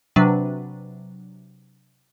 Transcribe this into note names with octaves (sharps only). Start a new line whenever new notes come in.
C3 F#3 D4 B4